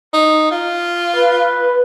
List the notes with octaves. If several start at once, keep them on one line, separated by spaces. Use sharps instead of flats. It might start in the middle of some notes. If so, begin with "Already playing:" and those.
D#4
F4
B4